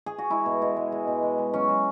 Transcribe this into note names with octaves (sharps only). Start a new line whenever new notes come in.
G#4
F#4
G#3 E4
B2
B2
G#3
G#3
B2
G#3
G#3
F#3 C#4
F#3